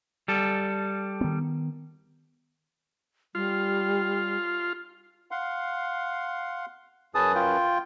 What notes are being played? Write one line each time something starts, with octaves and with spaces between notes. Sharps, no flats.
G3 A4
D#3 B3
G3 F4
F5 F#5 C6
F#2 C#4 G#4 B4 A5 D#6
F4 G5